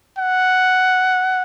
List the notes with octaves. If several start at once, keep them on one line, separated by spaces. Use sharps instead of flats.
F#5